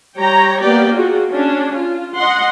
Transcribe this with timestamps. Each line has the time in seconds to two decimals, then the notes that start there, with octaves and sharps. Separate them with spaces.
0.18 G3 G4 C#5 G5 A#5
0.63 A#3 B3 G4 D5 G5
0.94 F4 F#4 G#4
1.31 C#4 D4
1.75 F4
2.16 D#5 F#5 C6